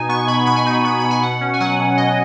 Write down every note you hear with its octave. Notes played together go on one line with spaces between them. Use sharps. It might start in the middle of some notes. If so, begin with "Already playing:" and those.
Already playing: B2 D#4 G#5
B3 C#6
B2 B5
B2 B5
G#5
D#4 B5
B3 B5
B2 B5
G#5
B2 F#5
C#4
G#5
F#3 F#5
B2
B2 D#5